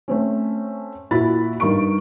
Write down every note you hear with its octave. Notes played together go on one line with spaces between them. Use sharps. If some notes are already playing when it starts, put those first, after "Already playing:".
A3 C4 C#4
A#2 E4 F#4 B5 A6
G2 D#4 A#4 C#6 D7